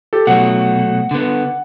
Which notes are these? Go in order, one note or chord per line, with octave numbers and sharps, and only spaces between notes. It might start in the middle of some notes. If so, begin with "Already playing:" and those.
G4 A4
B2 F#3 A3 F#5
D3 B3